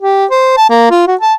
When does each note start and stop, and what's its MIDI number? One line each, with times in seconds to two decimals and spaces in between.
0.01 0.25 67
0.31 0.53 72
0.57 0.69 81
0.70 0.90 58
0.91 1.03 65
1.07 1.16 66
1.21 1.34 81